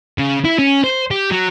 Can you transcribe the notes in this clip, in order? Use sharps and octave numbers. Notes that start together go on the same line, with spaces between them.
C#3
E4
C#4
C5
G4
F#3